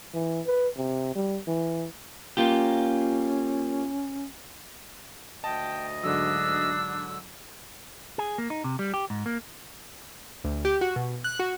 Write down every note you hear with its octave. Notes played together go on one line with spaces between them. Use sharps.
E3
B4
C3
G3
E3
A#3 C#4 F4 G4
D2 D#5 G5 A5
G#2 D3 F#3 D4 E6
G#4
A#3
D#4
C3
G3
G4
G#2
A#3
D2
G4
F#4
B2
F#6
F#4